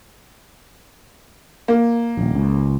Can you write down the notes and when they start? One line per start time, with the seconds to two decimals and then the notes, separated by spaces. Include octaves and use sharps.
1.68 A#3
2.17 D#1 A#1
2.35 C#2